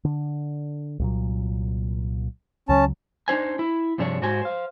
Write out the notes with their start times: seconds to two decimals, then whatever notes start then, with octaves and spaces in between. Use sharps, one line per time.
0.05 D3
0.99 C2 A#2 F#3
2.69 C#2 C#3 F#3 C#4 A5
3.28 D4 D#4 C5 G#5
3.59 E4
3.98 G2 C3 F3 D4 G#4 C#5
4.22 G#2 F#4 G4 C5 G#5
4.42 C5 F5